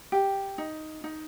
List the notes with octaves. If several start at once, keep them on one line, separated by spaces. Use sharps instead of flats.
G4
D#4
D#4